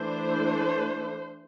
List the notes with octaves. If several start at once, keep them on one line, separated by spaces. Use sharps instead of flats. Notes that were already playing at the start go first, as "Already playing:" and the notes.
Already playing: E3 A3 D4 C5